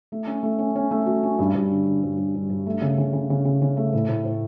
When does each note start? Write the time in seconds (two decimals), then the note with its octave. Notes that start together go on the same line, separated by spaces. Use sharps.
0.12 A3
0.27 C#4
0.43 A3
0.59 C#4
0.76 C#4
0.91 A3
1.06 F#4
1.23 C#4
1.39 G2
1.54 G2
1.70 D3
1.86 D3
2.03 G2
2.18 G2
2.35 G2
2.50 G2
2.66 A3
2.82 C#3
2.98 C#3
3.13 C#3
3.30 C#3
3.45 C#3
3.62 C#3
3.77 A3
3.93 A2
4.08 A2
4.25 A2